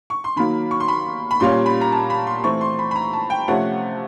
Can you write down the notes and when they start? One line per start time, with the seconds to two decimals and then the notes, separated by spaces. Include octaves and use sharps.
0.10 C#6
0.24 C6
0.36 D#3 F#3 A#3 B5
0.71 C#6
0.80 C6
0.88 B5
1.31 B5
1.40 A#2 G3 A#3 C#4 C6
1.66 B5
1.81 A#5
1.92 A5
2.10 B5
2.27 C6
2.44 E3 A3 C4 C#6
2.61 C6
2.79 B5
2.91 B5
2.95 A#5
3.13 A5
3.30 G5
3.48 C3 F3 A3 C#4 F#5